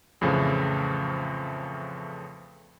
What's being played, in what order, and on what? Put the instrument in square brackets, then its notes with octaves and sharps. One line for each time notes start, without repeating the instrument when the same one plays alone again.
[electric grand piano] F2 A2 C#3 E3 F3